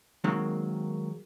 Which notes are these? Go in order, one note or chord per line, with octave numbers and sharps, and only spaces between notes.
D#3 F#3 G#3 A#3 C4